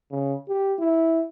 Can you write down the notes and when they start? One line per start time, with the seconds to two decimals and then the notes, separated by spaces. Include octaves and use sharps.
0.11 C#3
0.48 G4
0.79 E4